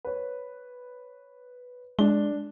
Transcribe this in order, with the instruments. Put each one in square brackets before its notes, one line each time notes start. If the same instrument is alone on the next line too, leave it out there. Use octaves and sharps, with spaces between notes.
[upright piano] B4 C#5
[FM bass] G#3 [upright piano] D4 G7